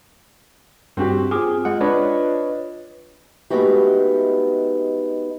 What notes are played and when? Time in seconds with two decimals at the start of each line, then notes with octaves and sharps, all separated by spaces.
0.97 G2 C4 F#4 G4
1.31 C4 F4 G#4 D6
1.65 G#3 F#5
1.81 D4 B4 C#5 D#5
3.50 G#3 A3 B3 D#4 F#4 G4